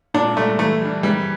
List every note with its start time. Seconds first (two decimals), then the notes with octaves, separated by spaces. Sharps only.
0.14 A#2 D4
0.37 G3 A3 D4
0.59 E3 A3
0.81 G3 D4
1.03 E3 G3